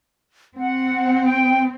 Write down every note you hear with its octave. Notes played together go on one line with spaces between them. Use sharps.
C4 F#5
G5